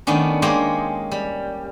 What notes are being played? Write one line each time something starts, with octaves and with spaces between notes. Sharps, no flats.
D#3 A3 B3 C#4 D4
G#3 A#3 C#4 G4 G#4 C5
G3